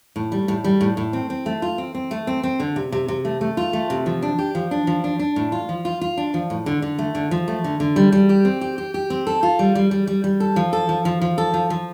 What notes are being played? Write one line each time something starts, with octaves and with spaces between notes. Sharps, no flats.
A2
G3
A2
G3
A2
A2
C4
C4
A3
F4
C4
C4
A3
C4
C4
D3
C3
C3
C3
A3
A3
F4
A3
C3
F3
D4
G4
F3
D4
F3
D4
D4
A2
F4
F3
F4
F4
D4
F3
A2
D3
D3
A3
D3
F3
A3
D3
D3
G3
G3
G4
C4
G4
G4
G4
C4
A4
F4
G3
G3
G3
G3
G3
A4
F3
A4
F3
F3
F3
A4
F3
F3